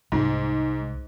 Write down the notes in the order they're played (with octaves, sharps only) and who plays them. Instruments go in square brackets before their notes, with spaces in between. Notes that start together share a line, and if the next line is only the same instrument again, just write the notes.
[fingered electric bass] C2 [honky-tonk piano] G#2